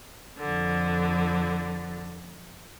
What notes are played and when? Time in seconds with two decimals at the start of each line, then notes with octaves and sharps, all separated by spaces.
0.40 F2 D3